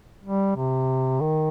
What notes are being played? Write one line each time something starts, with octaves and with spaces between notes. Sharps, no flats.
G3
C3
D#3